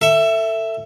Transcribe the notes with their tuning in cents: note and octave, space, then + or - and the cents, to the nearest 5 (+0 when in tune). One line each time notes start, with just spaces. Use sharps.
A4 +25 E5 +5